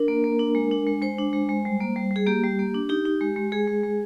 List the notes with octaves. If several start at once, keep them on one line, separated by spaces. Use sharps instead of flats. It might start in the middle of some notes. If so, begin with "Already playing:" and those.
Already playing: D4 A#4
A#3
A#3
D4
G#3
D4
G#3
G#3 C5
D4
G#3
G#3
G3
A#3
G3
G3 G#4
A#3 G4
G3
A#3
D4
D#4 G4
D#4
G#3
G#3
G#3 G#4
G#3
G#3